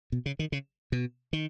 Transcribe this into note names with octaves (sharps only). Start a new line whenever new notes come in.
B2
C#3
D#3
C#3
B2
D#3